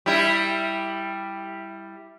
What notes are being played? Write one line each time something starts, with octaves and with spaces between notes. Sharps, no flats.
G3 E4